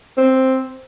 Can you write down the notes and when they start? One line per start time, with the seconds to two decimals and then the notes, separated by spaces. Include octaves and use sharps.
0.17 C4